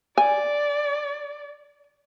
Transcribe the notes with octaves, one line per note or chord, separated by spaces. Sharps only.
D5 G#5